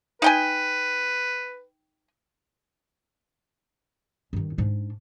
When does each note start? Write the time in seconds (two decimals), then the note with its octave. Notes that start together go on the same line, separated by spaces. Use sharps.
0.22 D#4 B4 G5 G#5
4.33 G2 D#3
4.58 G#2 D4